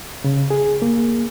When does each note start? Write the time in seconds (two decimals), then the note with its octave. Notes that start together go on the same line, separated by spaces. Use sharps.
0.24 C#3
0.51 G#4
0.82 A#3